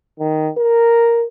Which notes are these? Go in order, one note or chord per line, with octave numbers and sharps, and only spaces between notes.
D#3
A#4